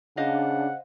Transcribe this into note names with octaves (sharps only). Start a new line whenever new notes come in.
C#3 D4 C5 D#5 F5 F#5